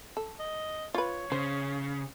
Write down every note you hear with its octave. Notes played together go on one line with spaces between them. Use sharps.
A4
D#5
F4 B4 C#5
C#3 C5